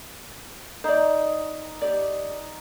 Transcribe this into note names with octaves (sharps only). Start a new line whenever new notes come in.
D#4 C5 D5
G4 D5